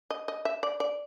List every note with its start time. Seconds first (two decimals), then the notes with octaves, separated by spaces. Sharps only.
0.10 D#5
0.28 D#5
0.45 E5
0.63 D5
0.80 D5